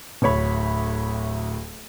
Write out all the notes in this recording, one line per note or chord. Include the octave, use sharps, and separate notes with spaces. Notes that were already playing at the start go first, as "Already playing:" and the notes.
D1 D2 C#5 B5